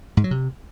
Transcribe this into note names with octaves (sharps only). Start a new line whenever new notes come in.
G#2
F#3
C3